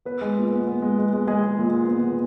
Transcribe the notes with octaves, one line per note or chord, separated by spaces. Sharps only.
B3 B4
G#3
A#2
B3
B3
G#3
G#3
G#3
G#3 G#4
G#3
A#2
B3
B3
A#2